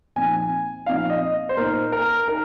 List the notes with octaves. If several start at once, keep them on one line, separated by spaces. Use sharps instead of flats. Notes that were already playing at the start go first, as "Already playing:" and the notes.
A#2 F3 C4 D#4 G#5
A#2 F3 C4 D#4 F5
D#5
C5
A#2 A#3 D#4 A#4
A#4
D#4 A#4